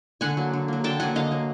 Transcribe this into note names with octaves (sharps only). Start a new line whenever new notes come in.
D3 F#5 G#5
F#3 A#3
D3
F#3 A#3
D3 G5 A5
F#3 A#3 F#5 G#5
D3 D#5 F5
F#3 A#3